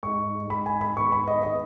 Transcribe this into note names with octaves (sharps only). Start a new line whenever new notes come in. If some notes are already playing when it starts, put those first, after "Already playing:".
G#2 G#3 D#4 C#6
G#2 G#3 D#4 B5
G#5
B5
G#2 D#3 G#3 B3 C#6
B5
D#5
D#3 G#3 B3 D#5